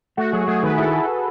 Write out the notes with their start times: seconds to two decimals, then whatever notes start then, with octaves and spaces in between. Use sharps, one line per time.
0.17 A3 F#4
0.32 F#3 G#4
0.48 A3 G#4
0.63 D#3 B4
0.78 E4 A4